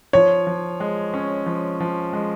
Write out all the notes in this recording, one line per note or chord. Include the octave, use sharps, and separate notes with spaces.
F3 C#5
F3
G#3
C#4
F3
F3
G#3